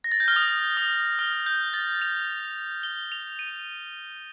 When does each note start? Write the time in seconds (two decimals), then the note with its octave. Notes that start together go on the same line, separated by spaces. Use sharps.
0.04 A#6
0.12 A6
0.20 G6
0.28 F6
0.36 D#6
0.77 D#6
1.19 F6
1.46 G6
1.74 A6
2.02 F7
2.83 G7
3.12 F7
3.39 D#7